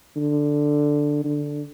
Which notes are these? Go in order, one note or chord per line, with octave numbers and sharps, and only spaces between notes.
D3
D3